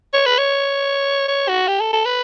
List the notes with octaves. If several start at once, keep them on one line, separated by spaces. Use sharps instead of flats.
C#5
B4
C#5
C#5
F#4
G4
A4
A4
B4